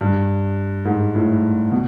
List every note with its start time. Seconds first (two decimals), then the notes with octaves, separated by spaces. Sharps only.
0.01 G2
0.85 G#2
1.15 A2
1.72 B2